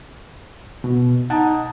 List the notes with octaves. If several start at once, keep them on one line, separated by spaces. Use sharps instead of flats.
B2
D#4 F#5 A5